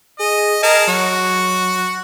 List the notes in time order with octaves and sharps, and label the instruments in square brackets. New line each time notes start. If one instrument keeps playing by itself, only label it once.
[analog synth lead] G#4 [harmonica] D#5
[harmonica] G#4 A#4 A5 [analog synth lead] D#5
[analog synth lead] F#3 [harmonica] F#4